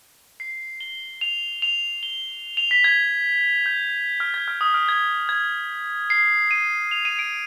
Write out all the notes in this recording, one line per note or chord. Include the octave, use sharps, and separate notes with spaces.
C7
G7
F7
F7
G7
F7
B6
G#6
G6
F6
G#6
F6
D#6
F6
G#6
G#6
C7
D#7
F7
D#7
D7